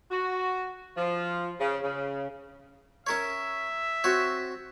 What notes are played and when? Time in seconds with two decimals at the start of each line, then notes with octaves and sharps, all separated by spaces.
0.11 F#4
0.97 F3
1.60 C#3
1.83 C#3
3.07 C#4 A#4 C#5 E5
4.04 C4 F#4 C#5